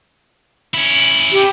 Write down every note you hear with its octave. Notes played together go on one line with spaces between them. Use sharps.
C#4 E4
G4